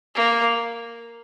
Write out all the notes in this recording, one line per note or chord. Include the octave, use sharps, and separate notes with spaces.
A#3